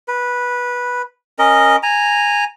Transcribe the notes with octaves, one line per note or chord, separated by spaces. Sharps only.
B4
C#4 A#4 D#5
G#5 A#5